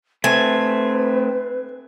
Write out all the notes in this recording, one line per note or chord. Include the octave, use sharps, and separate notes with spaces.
A3 C4 B4 G#5